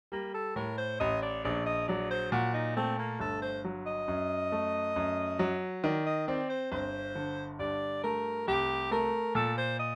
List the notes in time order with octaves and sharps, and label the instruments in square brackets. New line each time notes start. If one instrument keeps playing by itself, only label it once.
[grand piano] G3 [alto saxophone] A#3
[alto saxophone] A4
[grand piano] A2 [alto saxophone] A#4
[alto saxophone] C5
[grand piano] A1 [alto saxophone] D#5
[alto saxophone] D5
[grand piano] A#1 [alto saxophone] D5
[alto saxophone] D#5
[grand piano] F#3 [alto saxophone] D5
[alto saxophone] C5
[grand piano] A#2 [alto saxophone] F#4
[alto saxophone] D#4
[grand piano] A3 [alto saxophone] C4
[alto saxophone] A#3
[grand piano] G1 [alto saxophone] A4
[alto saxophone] C5
[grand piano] F#3
[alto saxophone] D#5
[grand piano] F#2
A3
F#2
F#3
[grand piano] D#3 [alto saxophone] D5
[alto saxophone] D#5
[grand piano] C4 [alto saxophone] D5
[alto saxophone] C5
[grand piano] G1 [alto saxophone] C5
[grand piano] D3
[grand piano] G2 [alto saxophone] D5
[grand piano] A3 [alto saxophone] A#4
[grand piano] C2 [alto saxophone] G4
[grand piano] A3 [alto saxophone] A#4
[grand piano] A#2 [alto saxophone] A4
[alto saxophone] C5
D#5